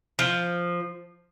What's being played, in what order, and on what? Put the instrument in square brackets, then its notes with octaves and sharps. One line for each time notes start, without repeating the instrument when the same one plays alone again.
[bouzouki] F3